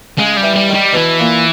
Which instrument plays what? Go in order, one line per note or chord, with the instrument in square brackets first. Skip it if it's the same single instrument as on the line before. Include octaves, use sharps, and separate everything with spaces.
[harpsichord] C#3 [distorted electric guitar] G#3
[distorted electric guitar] G3
[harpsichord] E3
[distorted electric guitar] G3
[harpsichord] D#3
[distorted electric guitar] G3
[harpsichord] B2 [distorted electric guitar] E3
[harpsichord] A#2